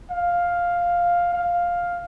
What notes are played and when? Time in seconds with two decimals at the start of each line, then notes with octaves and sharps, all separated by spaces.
0.10 F5
1.33 F5